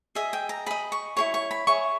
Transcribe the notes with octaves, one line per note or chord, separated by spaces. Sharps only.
G#4 D#5 E5
G5
A#5
G#4 D#5 B5
C#6
E4 G#4 C#5 C#6
C#6
B5
E4 G#4 C#5 C#6